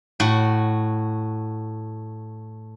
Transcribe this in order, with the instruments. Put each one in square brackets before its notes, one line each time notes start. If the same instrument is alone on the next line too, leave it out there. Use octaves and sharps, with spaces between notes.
[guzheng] A2 F#4